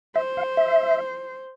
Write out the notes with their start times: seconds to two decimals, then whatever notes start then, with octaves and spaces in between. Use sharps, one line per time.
0.16 C5 E5
0.37 F5
0.57 E5